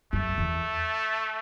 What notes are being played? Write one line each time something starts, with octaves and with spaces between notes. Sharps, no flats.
F#2 A3
E2